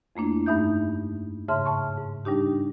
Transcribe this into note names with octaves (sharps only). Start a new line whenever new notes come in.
F2 A3 A#3 D4 E4
G2 A3 D#4 E5 G6
G#2 C#3 E5 A5 C6 F6
A5 C#6
G#2
G3 D4 D#4 G4